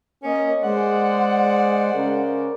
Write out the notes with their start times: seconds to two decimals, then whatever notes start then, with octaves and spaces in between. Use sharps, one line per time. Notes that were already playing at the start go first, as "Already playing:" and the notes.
0.23 A#3 C#4 D#5
0.64 G#3 C5 D5 F#5
1.94 C#3 A#4